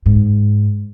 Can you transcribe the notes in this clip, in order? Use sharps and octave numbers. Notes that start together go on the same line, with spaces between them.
G#2